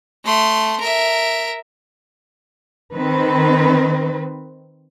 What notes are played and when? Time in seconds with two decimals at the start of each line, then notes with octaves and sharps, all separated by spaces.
0.25 A3 C6
0.80 A#4 E5
2.92 D#3 C4 B4